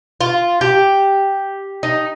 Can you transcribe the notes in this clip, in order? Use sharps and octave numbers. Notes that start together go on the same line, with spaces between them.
F4
G4
D#4